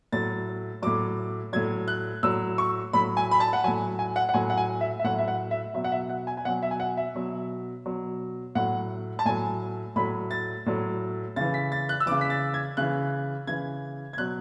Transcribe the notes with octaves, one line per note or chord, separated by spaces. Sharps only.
A2 F#3 A6
A2 F#3 D6
A2 F#3 G#6
F#6
A2 F#3 E6
C#6
A2 F#3 B5
G#5
B5
A5
F#5
A2 F#3 G#5
G#5
F#5
F#5
A2 F#3 G#5
F#5
G#5
E5
E5
A2 F#3 F#5
E5
F#5
E5
B2 F#3 E5
F#5
E5
F#5
G#5
G#5
B2 F#3 F#5
E5
G#5
F#5
E5
B2 F#3
B2 F#3
A2 F#3 F#5
A5
A2 F#3 G#5
A2 F#3 B5
A6
A2 F#3
C#3 E3 A6
B6
A6
F#6
E6
C#3 E3 D6
B6
A6
G#6
C#3 E3 F#6
C#3 E3 G#6
G#6
B2 F#3 F#6